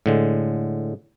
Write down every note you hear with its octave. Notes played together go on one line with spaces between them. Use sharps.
A2 D3 G#3